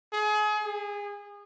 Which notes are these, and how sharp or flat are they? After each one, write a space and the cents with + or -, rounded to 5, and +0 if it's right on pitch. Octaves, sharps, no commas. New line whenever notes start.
G#4 +30
G#4 -25